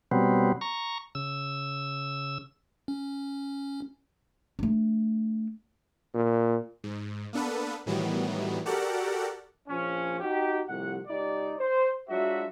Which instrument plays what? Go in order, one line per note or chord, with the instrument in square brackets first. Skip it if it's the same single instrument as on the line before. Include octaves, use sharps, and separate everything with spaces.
[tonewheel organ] B2 F#3 G3 B3 C4
A#5 C#6
C#3 E6
[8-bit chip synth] C#4
[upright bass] A3 D4
[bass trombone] A#2
[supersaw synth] G#2
A#3 B3 D4 A4 B4
A2 D#3 E3 F#3 G3 B3
F#4 G4 A4 A#4 D5 F#5
[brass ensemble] A#1 F3 C#4
D#4 F#4 G4
C2 A2 C3 F3 F#5
C#2 D#4 G4 D5
C5
F#3 G#3 D4 F4 F#4 E5